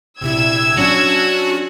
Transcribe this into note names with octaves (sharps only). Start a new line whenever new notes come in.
A#1 C3 E4 E6 G#6
F#3 C#4 D4 F#4